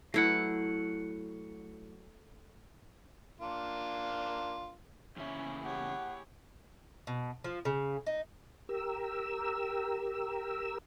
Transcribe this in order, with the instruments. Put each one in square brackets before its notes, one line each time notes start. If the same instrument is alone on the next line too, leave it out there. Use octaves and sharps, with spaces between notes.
[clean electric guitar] F#3 F#5 [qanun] A3 E4
[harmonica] A#3 D4 F4
[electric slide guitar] E2 C#3 E5 [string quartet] A#3 E4 G#4 [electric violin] C#4
[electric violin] G4 C#5 [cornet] F#5
[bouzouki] B2
F3
C#3
D#4
[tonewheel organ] G4 A#4 E6